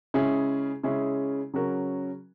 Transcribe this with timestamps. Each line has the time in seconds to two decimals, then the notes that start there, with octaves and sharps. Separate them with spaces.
0.14 C#3 G#3 C#4 E4 G#4
0.83 C#3 G#3 C#4 E4 G#4
1.54 C#3 F#3 C#4 F#4 A#4